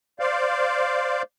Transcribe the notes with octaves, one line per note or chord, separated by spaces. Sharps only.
C5 D5 F5